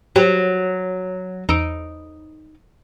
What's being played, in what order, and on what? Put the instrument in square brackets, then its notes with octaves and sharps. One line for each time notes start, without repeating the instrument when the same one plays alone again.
[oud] F#3 [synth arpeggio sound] G4
[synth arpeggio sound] E2 E6 D7 [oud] D#4